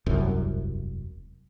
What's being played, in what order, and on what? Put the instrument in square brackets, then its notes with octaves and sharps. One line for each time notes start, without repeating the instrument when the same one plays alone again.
[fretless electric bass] E1 C2 F#2